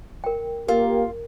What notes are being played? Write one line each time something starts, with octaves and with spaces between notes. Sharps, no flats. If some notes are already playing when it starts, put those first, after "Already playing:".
A#4 G5
A#3 F4 G4 A#4